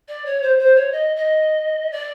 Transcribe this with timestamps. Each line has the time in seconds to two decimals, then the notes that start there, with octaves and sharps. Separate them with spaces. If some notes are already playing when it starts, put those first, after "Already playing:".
0.08 D5
0.26 C#5
0.42 C5
0.59 C5
0.76 C#5
0.92 D#5
1.16 D#5
1.91 D5